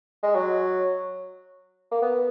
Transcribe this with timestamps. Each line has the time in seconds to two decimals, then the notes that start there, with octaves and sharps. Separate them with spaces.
0.23 G#3
0.35 F#3
1.91 A#3
2.02 B3